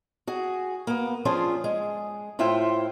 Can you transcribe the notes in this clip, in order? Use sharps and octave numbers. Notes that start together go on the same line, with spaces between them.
F#4 G#4
A#3 B3
F3 C#4 D4 F4 G#4 C5
G#3 G#4
A2 E4 F4 C5 E5 G5